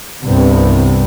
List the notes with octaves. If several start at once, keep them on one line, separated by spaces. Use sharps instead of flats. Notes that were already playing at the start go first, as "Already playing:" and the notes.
C2 G2 C3 B3